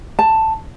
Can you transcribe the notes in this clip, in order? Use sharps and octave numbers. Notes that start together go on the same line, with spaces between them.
A5